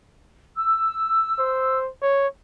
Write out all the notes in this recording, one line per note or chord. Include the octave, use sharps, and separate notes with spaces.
E6
C5
C#5